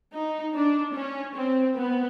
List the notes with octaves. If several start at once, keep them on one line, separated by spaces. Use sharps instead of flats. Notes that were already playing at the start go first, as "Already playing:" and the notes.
D#4
D4
C#4
C4
B3